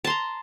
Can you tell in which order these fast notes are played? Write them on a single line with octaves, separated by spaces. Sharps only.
A5 C6 A#5